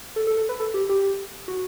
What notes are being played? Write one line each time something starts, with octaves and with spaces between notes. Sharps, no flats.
A4
A4
A4
B4
A4
G4
G4
F#4